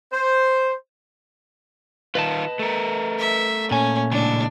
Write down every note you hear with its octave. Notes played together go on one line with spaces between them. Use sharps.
C5
D#3 F4 B4 D#5 A5
A3 A#4
E5
A#2 C#4 G#5
C#2 A2 D4